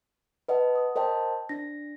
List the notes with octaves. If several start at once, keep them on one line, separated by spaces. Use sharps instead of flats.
B4 D#5 F#5 A5
D#6
A#4 C5 D#5 G5 A5
D4 A#6